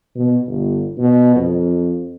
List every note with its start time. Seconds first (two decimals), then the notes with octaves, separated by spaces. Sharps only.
0.15 B2
0.47 G1
0.98 B2
1.36 F2